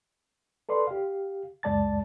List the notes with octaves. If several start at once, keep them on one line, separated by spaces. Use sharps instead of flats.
A4 B4 D5 C6
G4 F5
C#2 F#2 G#3 D5 A5 A6